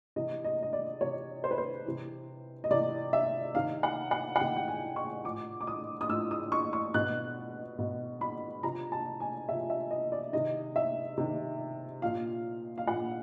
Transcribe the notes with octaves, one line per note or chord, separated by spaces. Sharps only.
C3 E3 D#5
D#5
D#5
D5
C3 E3 C#5
C5
B4
C5
C3 E3
D#5
C3 E3 D5
E5
C3 D#3 F5
F#5
F#5
F#5
C3 D#3 G5
G5
G#5
C#6
A2 F3 D6
D6
D#6
D#6
A2 F3 E6
D#6
C#6
C#6
B2 F#6
B2
B5
C3 F3 A#5
A5
G#5
C3 F3 E5
E5
D#5
D5
C3 D#3 D#5
E5
C3 D#3
A#2 F3 F5
F5
A#2 F3 F#5